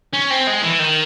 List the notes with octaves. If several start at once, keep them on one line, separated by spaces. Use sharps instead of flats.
C#4
C4
G#3
E3
D#3